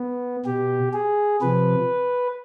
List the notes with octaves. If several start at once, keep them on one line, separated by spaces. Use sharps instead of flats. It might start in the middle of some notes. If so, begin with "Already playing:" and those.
Already playing: B3
B2 G4
G#4
C3 F3 B4